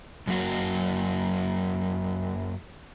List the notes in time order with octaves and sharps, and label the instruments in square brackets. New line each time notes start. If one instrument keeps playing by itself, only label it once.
[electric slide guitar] F#2 F#3 A#3 F#4